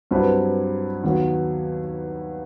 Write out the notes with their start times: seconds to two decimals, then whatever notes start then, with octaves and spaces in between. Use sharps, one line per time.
0.11 G2 F#3 C4 E4 B4
1.03 D#2 D#3 F#3 B3